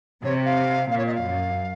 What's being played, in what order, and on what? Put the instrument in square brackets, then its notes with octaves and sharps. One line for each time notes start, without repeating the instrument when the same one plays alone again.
[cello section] C3 [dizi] C#5
[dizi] F5
[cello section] A#2 [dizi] F5
[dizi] C#5
D#5
F5
[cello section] F#2